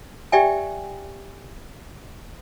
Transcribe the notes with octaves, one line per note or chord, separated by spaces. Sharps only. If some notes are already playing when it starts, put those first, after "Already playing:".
G4 D5 E5 G5 G#5